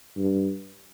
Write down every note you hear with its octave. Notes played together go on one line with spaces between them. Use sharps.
G2